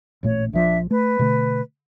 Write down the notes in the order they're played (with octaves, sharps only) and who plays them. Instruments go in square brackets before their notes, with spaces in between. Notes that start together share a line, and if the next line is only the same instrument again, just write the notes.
[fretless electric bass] A1 A#2 A3 [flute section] C#5
[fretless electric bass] A#1 F3 [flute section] D4 E5
[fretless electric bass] A3 [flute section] B4
[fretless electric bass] B2 D3 A3